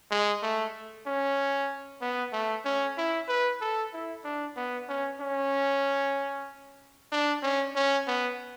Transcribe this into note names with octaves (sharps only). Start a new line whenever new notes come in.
G#3
A3
C#4
B3
A3
C#4
E4
B4
A4
E4
D4
B3
C#4
C#4
D4
C#4
C#4
B3